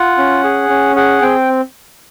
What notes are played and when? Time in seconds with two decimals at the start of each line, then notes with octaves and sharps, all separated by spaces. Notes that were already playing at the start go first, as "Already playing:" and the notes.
Already playing: F4 F#5
0.18 C#4
0.44 G#4
0.70 C#4
0.96 G#4 F#5
1.22 C4 G5